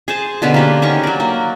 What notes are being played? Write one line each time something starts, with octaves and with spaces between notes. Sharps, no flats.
G#4 C5 A5
B2 D3 B3 C#4
A#3 G4 B4
D#3 C#4 A#4 C#6
F#3 D5
A#3